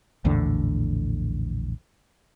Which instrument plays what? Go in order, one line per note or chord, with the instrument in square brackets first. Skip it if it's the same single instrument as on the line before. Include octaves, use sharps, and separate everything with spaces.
[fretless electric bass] A#1 E2 A2 D3